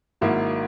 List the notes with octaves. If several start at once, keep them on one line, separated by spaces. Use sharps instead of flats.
G#1 G#2 F#3 A#3 E4